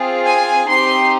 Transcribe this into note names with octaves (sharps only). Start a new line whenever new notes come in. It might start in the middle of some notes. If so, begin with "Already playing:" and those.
Already playing: C4 F4 G#4
G#5
C4 D#4 G4 C6